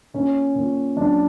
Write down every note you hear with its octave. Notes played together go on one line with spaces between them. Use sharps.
A#2 C#4
A#2
F#3 D4